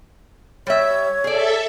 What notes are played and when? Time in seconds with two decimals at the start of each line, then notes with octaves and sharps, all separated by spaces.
0.67 G3 C#5 E5
1.24 G#4 A4 D5 E5